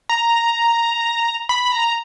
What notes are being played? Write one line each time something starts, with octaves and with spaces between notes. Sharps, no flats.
A#5
B5
A#5